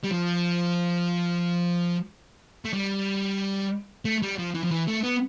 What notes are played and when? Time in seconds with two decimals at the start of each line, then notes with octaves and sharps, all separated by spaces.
0.04 G3
0.10 F3
2.65 A3
2.73 G3
4.05 A3
4.22 G3
4.38 F3
4.54 E3
4.63 F3
4.71 E3
4.88 A3
5.04 B3